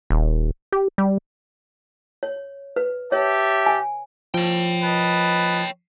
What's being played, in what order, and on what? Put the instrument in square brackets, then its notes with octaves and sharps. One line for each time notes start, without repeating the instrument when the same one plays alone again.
[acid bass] D#1
G4
G3
[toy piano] C#5
B4
[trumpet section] G4 E5 A5 [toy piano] C#5
[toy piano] G#5
[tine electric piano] F3 [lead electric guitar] C#5 G5
[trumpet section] B4 D#5 A5